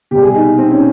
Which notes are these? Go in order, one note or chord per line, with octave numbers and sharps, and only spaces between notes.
C2 B2 G4
G#4
D#4
C4
C#4